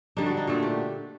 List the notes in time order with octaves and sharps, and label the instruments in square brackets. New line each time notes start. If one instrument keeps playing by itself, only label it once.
[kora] D3 G3 D4 D#4
F#4
D#4
A#2 A3 D4
G4